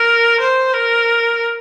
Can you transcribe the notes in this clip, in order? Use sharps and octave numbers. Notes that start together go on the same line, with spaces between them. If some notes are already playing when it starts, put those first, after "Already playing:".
Already playing: A#4
C5
A#4